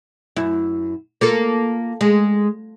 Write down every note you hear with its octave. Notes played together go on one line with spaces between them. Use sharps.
F#2 E4
A#3 F4 A4
G#3